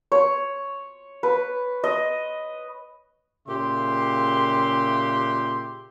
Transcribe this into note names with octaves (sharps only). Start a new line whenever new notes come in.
C#5
B4
D#5
A#2 C#3 G4 E5 C6